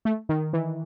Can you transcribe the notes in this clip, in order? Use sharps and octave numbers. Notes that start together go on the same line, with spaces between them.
A3
D#3
E3